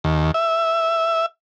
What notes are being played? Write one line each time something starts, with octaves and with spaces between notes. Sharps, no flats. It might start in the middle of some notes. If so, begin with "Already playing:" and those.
D#2
E5